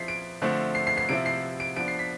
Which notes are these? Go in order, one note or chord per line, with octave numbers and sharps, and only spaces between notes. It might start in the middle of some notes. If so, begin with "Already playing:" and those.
Already playing: F3 C4 E4 B6 C7
D7
D3 F3 A3 C4
C7
C7
C7
C3 F3 C4 E4 D7
C7
D7
F3 B3 D4 D7
C7
B6